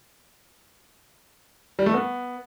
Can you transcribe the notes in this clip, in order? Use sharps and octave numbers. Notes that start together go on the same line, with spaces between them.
G3
A3
B3